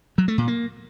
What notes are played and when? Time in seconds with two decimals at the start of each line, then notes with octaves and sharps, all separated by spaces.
0.18 F#3
0.28 A3
0.38 A#2
0.48 A#3